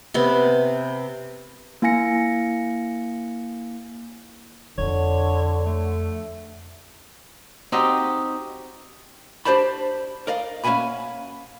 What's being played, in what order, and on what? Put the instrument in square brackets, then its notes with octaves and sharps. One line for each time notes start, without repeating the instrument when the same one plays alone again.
[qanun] C3 B3
[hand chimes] A#3 E4 F5 G#5 A#6 C#7
[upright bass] F2 [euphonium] D3 [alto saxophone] C#5
[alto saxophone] A3
[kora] C4 D#4 F#4 G4
[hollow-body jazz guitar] D4 G4 C5 D5 A5 B5
A#4 D5 D#5 F5
A#3 C#4 E5 F#5 G#5 B5